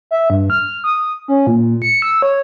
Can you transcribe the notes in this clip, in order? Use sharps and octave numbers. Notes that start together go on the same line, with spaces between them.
E5
G2
F6
D#6
C#4
A#2
C#7
E6
C#5